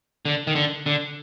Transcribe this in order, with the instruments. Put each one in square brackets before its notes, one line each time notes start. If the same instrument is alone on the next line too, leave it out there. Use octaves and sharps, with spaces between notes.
[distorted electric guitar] D3
D#3
D3
D3